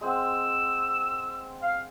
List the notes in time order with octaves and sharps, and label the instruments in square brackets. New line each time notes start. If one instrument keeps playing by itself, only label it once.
[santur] G#3 C4 F#5 [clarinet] E6
[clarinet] F5